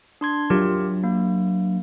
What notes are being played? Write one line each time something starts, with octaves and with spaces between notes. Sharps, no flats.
D4 C6 G#6
F#3 D4 F4 G4 A#4
A#3